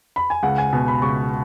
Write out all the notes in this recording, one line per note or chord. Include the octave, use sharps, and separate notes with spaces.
B5
G#5
C#2 F#5
G#5
B2
B5
C#2 C#6